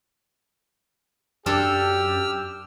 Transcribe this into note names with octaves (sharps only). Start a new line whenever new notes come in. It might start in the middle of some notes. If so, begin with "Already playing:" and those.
F#2 D4 G4 A4 E6 F6